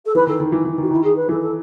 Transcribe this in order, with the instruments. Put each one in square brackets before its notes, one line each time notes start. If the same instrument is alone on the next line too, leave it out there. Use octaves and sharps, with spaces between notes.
[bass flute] A4
[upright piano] E3 [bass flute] B4
[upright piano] D#3 [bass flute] A4
[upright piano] D#3
E3
E3
D#3
[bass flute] F#4
[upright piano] D#3 [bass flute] E4
[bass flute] G#4
B4
[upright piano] E3 [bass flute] A4
[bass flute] A4